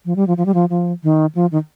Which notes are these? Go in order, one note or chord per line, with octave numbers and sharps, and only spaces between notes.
F3
G3
F3
F3
G3
F3
F3
D#3
F3
D#3